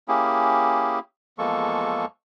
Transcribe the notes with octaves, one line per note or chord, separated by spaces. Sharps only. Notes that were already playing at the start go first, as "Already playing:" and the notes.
A#3 C#4 E4 G4 G#4
E2 F3 G#3 A#3 A4 C#6